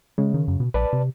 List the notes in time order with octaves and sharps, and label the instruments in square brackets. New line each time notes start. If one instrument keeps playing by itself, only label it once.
[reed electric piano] C#3 [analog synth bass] G#3
[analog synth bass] D#3
F#2
B2
[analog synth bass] A#1 [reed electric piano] B4 D5 A5
[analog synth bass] C3